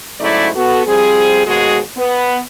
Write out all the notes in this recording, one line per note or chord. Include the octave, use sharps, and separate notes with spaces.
G#2 C#3 F#3 A3 E4 D5
B3 F#4 A4
F3 G3 C4 G#4
D#2 G#2 B2 G#3 F#4 G#4
B3